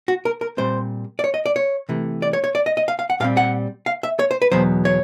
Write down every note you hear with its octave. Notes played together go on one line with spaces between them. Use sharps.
F#4
A#4
A#4
A#2 G3 C4 C5
D5
C#5
D#5
D5
C#5
C3 E3 A3
D5
C#5
C#5
D5
D#5
D#5
F5
F5
F#5
A#2 G3 C4 F5
F#5
F5
E5
C#5
C5
B4
E2 B2 F#3 B3 C5
C#5